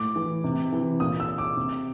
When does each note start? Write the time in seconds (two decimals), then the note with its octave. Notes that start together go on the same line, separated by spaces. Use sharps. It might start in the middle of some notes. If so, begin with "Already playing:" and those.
Already playing: A2 D6
0.16 E3
0.44 C3
0.72 E3
1.00 A#2 D#6
1.20 E6
1.38 D6
1.57 C3